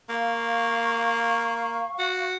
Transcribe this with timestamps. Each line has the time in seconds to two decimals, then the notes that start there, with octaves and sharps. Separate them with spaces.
0.09 A#3 F5 C#6
1.99 F#4